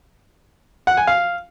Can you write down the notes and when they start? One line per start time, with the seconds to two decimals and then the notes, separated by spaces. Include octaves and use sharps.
0.87 F#5
0.97 G#5
1.07 F5